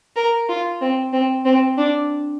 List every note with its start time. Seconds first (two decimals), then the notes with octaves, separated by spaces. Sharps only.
0.16 A#4
0.49 F4
0.81 C4
1.13 C4
1.45 C4
1.77 D4